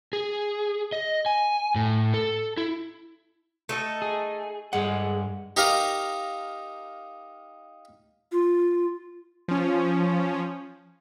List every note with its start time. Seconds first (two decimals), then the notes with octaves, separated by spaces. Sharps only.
0.13 G#4
0.92 D#5
1.26 G#5
1.75 A2
2.14 A4
2.57 E4
3.69 A3 D#4 A4
4.02 G#4
4.73 G2 G#3 F#5
5.57 D#4 G4 A#4 F5
8.32 F4
9.48 F3 C#4